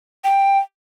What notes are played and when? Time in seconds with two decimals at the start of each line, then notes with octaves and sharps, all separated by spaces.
0.24 G5